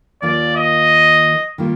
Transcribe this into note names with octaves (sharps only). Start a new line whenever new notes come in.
D#2 D#3 A#3 F4 D5
D#5
D#3 G3 A#3 F4